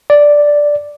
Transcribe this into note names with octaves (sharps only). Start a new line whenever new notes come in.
D5